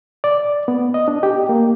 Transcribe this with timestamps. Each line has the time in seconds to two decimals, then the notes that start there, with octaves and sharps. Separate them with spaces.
0.24 D5
0.68 B3
0.94 D#5
1.08 D4
1.23 G4
1.49 A#3